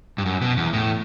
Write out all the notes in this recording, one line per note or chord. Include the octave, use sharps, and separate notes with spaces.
G2
F#2
B2
E2
A2